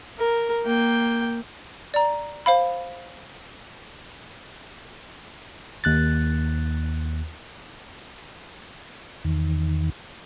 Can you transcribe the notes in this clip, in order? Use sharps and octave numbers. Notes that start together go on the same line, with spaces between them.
A#4
A#3 G5
D5 A#5
C5 F5 B5
D#2 F#6 A6
E2 D#3